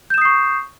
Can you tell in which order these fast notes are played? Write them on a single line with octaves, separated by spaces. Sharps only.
G6 E7 D#6 C7 C#6